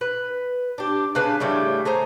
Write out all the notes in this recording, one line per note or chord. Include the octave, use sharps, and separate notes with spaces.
B4
D4 G4
C#3 D4 B4 A5
A2 C#3 G3 A3
A3 G#4 C5 A#5